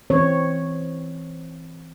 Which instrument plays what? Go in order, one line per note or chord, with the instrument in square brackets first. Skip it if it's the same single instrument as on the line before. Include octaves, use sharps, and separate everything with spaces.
[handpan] E3 C4 C#4 C#5